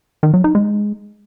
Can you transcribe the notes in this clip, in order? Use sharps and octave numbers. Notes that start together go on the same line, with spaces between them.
D#3
F#3
D#4
G#3